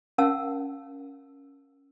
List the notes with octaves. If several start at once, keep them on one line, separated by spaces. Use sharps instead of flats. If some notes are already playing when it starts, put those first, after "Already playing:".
C#4 A#4 F5 F#5 A5 E6